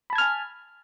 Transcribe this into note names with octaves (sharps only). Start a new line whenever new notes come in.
G#5 A5 B5 F6 G#6